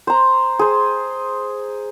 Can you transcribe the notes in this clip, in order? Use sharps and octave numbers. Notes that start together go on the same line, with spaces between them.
C5 A#5
G#4 C5